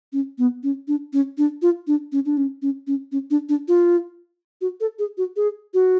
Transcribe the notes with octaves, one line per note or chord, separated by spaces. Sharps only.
C#4
B3
C#4
D4
C#4
D4
F4
D4
C#4
D4
C#4
C#4
C#4
C#4
D4
D4
F4
F#4
A4
G#4
F#4
G#4
F#4